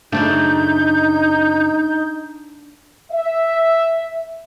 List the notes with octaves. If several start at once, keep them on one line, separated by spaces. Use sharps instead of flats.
F#2 C#3 A3 D4 D#4 G6
E5